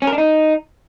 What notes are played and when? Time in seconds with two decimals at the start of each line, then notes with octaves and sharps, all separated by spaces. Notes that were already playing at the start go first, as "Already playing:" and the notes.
0.02 C#4
0.07 A#4
0.13 D4
0.18 D#4